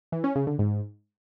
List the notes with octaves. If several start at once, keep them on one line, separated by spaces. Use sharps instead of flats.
E3
C#4
C#3
D3
G#2